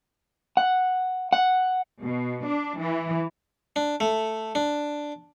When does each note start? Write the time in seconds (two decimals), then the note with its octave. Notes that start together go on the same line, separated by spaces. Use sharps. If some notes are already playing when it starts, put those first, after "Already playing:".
0.57 F#5
1.33 F#5
2.03 B2
2.45 D4
2.80 E3
3.76 D4
4.00 A3
4.55 D4